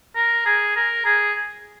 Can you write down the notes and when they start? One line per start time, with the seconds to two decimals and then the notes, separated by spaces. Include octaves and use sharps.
0.15 A#4
0.45 G#4
0.76 A#4
1.05 G#4